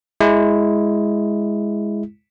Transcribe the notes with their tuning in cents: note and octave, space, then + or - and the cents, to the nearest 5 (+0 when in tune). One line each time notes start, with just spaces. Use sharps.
G#3 +0 E4 +0